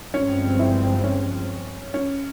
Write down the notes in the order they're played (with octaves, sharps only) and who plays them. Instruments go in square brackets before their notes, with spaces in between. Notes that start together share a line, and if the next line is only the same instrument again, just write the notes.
[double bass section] G1 G2 F3 G#3 C4 [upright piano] C#4
[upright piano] E4
C#4
C#4